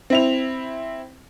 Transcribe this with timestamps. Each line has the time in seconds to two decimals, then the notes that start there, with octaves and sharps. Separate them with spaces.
0.10 C4 E4 F7